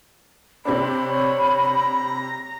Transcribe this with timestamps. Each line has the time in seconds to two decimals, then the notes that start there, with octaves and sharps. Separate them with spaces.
0.65 C3 C4 D4 B5
1.06 C#5
1.58 A#5